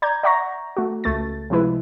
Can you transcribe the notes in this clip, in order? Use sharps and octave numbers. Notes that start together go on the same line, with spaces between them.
D5 A#5 G6 G#6
D5 E5 F#5 A#5 C#6 A#6
A3 F#4
C#2 A3 A6
C3 F3 G#3 E4 B4